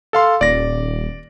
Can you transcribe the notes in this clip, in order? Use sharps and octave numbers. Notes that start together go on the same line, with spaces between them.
A4 F5 C6
D#1 D5 A#6